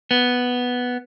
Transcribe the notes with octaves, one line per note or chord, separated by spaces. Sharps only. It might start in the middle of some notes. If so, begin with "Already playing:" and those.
B3